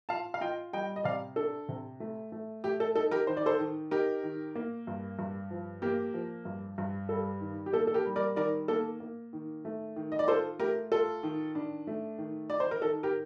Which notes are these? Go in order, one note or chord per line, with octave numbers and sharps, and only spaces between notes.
F4 F5 A5
F5
F4 D#5 G5
G3 D#5 G5
D#5
C3 D5 F5
D4 A4
C3
A3
A3
A3 G4
A4
D#4 A4
G4 A#4
D#3 C5
D5
A4 C5
D#3
D#4 G4 A#4
D#3
A#3
G2
G2
F3
A#3 G4 A#4
F3
G2
G2
G3 A4
D#3
G4
A#3 A4
A4
G4 A#4
G3
A#4 D5
D#3 A#4 D5
A#3 A4
A#3
D#3
A3
D#3
D#5
D5
F4 A4 C5
A3 G4 A#4
F4 A4
D#3
D4
A3
D#3
D#4 D5
C5
A#4
D#3 A4
G4 A#4